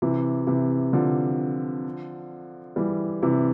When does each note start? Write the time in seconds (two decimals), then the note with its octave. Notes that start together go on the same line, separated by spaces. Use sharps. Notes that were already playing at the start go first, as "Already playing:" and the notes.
0.02 C3 E3
0.47 C3 E3
0.93 D3 F3
2.76 E3 G3
3.23 C3 E3